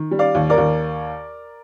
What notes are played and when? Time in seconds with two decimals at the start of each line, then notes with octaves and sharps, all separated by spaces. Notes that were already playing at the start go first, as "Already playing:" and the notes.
Already playing: D#3
0.11 G3
0.19 D5 F5
0.35 D#2
0.50 A#4 D5
0.58 D#2